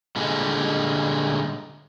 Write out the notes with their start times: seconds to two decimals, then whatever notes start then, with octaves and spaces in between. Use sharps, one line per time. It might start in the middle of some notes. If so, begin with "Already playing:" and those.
0.16 A#2 D3 G3 G#3